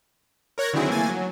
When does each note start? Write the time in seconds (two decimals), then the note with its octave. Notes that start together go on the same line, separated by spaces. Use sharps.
0.58 A#4 C#5 F#6 G#6 A#6
0.73 D3 D#3 F#3 C4 E4 G#4
0.88 E3 A3 A#3 G#5 A6
1.10 F#3